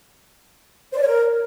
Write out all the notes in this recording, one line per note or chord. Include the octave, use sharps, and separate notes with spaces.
C5
D5
C#5
A#4